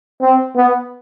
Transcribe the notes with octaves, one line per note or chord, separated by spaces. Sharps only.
C4
B3